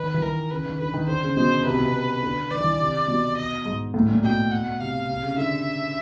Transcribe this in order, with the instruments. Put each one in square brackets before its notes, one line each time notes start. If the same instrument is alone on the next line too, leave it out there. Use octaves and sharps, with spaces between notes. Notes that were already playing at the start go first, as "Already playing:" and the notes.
Already playing: [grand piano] D#3 [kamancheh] B4
[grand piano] E3
[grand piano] D#3 [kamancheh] A#4
[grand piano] C#3 [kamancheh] B4
[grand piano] D#3
[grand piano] D3 [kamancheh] B4
[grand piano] D#3
[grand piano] D3 [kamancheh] C5
[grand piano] C#3
[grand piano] B2 [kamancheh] C5
[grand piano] C3 [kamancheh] B4
[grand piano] B2
C3
D3
[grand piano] D#3 [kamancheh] D5
[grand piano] E3
D#3
C3
B2
[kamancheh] D#5
[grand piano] G#2
A2
A#2
[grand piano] B2 [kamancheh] G5
[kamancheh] F#5
[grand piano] C3 [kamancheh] F5
[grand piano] C3
C#3
[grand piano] D3 [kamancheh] E5